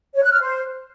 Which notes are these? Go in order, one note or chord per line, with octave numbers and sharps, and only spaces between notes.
C#5
F#6
F6
C5